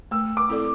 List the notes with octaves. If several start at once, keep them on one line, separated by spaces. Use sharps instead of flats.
A3 E6
D6
C4 E4 A4 D5